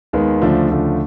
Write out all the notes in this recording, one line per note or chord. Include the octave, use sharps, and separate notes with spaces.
D#2 D#3 G#3 B3
D2 C#3 F3 A3 D4
D2 C#3 F3 A3 D4